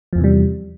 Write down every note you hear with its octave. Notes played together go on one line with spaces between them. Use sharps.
E2 C3 E3 F3 G3